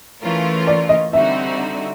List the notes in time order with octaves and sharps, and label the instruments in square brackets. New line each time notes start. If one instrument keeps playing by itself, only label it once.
[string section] E3 A3 C#4 F4 A#4
[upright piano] D5
D#5
[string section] D3 G3 C4 D#4 F#4 [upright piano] E5